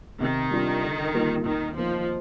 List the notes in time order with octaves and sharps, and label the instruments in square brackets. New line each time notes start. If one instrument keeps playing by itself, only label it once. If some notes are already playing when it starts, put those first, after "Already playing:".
[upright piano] C3 [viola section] D#3
[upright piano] G3 D4 F4
D3
G3 A#3 F4
[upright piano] D#2 [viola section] D#3
[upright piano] D#3 A#3 D#4 [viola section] F3